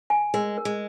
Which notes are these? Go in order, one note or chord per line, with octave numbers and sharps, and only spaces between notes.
G#5
G#3 A#4
A#4
G#3